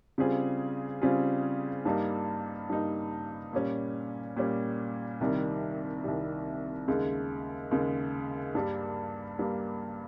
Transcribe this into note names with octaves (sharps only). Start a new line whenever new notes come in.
C#3 G3 C4 F4 G#4
C#3 G3 C4 F4 G#4
G2 G3 A#3 D#4
G2 G3 A#3 D#4
A#2 G3 C#4
A#2 G3 C#4
C2 C3 D#3 G3
C2 C3 D#3 G3
D#2 C#3 G#3
D#2 C#3 G#3
G2 G3 A#3
G2 G3 A#3